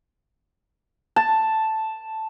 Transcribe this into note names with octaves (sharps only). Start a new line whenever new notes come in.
A5